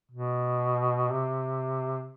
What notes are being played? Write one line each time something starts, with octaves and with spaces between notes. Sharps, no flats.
B2
C3